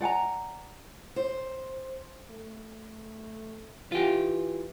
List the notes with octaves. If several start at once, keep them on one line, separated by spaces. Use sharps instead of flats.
D5 F#5 G#5 A#5
C5
A3
E3 F4 G4